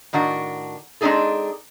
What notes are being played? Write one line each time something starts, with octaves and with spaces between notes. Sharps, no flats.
A2 D#3 D4 F#4 F#5
G#3 C4 D4 D#4 G#4 A4